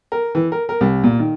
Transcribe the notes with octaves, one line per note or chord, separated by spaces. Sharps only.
A#4
E3
A#4
A#4
C2
A#2
D#3